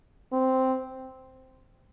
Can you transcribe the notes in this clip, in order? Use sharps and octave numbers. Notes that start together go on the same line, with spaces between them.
C4